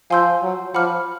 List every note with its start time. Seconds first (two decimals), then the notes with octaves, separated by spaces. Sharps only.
0.10 F3 F5 G#5 C6 E6 G6
0.43 F#3
0.74 F3 F#5 B5 D6 F6